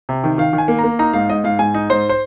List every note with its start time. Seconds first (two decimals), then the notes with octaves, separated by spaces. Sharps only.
0.09 C3
0.24 D#3
0.38 D#3 F5
0.53 D#3
0.58 G#5
0.68 A#3
0.79 A#3 A#5
0.99 D#4 A#5
1.13 G#2 F5
1.29 G#2 D#5
1.44 G#2 F5
1.59 G#2 G#5
1.74 D#4
1.90 G#2 C5
2.09 C5